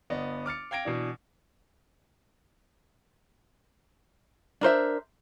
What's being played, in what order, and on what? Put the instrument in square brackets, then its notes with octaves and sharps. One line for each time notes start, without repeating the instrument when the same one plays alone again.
[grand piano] G1 B3 D5 D#5
D6 F6 A6 C#7
F5 G5 G#6 A#6 D7
B2 E3 D4
[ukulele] D4 A#4 C5 E5